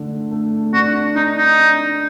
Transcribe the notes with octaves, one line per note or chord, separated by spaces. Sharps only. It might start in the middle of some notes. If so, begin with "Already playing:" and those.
Already playing: D3 A3 D4
A3
D4 F#4
D4 D#4
D#4
D4